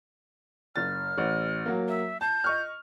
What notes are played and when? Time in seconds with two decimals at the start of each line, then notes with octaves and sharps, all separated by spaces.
0.76 F#1 F6 A6
1.18 A1
1.66 F#3 A#3
1.88 E5
2.21 A5 G6
2.44 D#5 C#6 F6